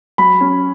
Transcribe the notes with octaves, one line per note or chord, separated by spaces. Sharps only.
F#3 B5
C#4